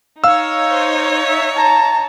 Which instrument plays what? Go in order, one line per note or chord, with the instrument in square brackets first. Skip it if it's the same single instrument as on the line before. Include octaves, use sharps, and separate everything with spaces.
[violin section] D#4 C#5 [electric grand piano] F5 E6
[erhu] C5
E5
[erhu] A5 [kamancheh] A#5